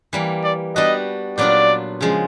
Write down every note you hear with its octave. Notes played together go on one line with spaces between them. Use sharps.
E3 G3 A#3
D5
G3 B3 D4 F#4 D#5
A#2 F#3 B3 D4 F4 D5
C#3 F3 G#3